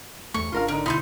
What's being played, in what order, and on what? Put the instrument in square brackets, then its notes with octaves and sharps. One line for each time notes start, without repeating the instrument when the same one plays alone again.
[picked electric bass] E2 A3 [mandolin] C#6
[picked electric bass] G#1 D4 [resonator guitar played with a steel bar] F4 A#4 F5
[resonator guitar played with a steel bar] D3 D#4 [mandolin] A#4
[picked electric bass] C#2 B2 D3 [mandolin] D#4 C6 G6 [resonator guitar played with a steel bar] E4